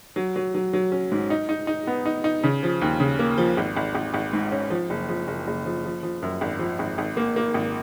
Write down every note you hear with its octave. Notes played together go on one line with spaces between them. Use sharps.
F#3
F#3
F#3
F#3
C#4
G#2
D#4
D#4
D#4
B3
D#4
D#4
C#3
F3
D#2
C#3
A#3
F3
G#1
G#1
G#1
G#1
G#2
C#4
F3
F#1
F3
F#1
F#1
F3
F3
F3
F#2
G#1
F3
G#1
G#1
A#3
A#3
G#1